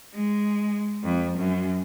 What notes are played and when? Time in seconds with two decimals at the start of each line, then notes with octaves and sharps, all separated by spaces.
0.15 G#3
1.04 F2
1.38 F#2